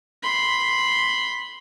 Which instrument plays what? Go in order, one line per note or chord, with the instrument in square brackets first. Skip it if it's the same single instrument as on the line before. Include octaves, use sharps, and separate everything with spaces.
[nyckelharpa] B5 C6